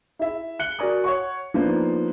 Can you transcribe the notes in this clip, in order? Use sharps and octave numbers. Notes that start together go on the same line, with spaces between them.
E4 G#4 E5
F#6 C#7 G7
F#4 A#4 D5 G#5 A#5 D#6
C#5 F#5 C#6
F3 A#3 B3 D4 D#4 F4